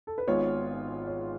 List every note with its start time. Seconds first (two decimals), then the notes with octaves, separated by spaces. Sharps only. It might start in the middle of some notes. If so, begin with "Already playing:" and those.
0.07 A4
0.18 B4
0.27 G#1 G#2 G#3 B3 F4 C#5
1.07 C#5